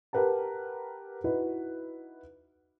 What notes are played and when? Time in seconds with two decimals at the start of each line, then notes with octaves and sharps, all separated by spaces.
0.13 G4 A#4 B4 F#5 A5
1.24 D#4 E4 F#4 B4